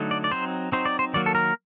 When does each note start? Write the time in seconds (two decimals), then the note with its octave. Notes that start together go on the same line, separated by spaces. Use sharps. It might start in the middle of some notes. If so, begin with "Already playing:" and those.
Already playing: D3 F#3 A3 D#4
0.11 D5
0.24 D5
0.31 F#3 C4 D#4 C5
0.72 F#3 C4 D#4 C5
0.85 D5
0.99 C5
1.14 D#3 F#3 A#3 D5
1.26 A4
1.35 A#4